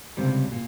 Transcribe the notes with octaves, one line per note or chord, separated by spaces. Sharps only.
C#2 C3 G3
A#2